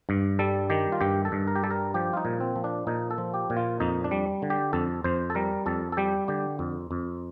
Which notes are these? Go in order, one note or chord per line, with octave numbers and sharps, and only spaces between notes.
G2
G3 A4
D#3 G4
F4
G2 G4
A4
G2
A#4
G4
G3 A4
A#4
F3 G4
F4
D#4
A#2
C4
F3
D4
A#2 D#4
A4
F3
G4
A#2
F4
F2 D#4
D4
G3
D3
G4
F2 A4
F2 C5
A4
G3 A#4
F2 A4
A4
G3 G4
D3 G4
F2
F2